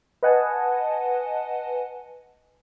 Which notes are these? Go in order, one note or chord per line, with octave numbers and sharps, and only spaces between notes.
B4 D#5 F#5 G#5 A5